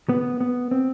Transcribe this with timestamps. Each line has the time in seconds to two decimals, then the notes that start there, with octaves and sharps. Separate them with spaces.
0.09 B3
0.41 B3
0.71 C4